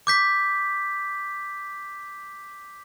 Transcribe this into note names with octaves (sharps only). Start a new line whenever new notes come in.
D6 G6 B6